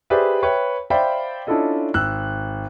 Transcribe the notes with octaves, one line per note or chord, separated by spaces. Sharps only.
G4 G#4 B4 C5 D5 E5
B4 C#5 E5 G5
C5 D5 E5 F5 G5 B5
C#4 D4 E4 F4 A4 D#5
G#1 E6 F#6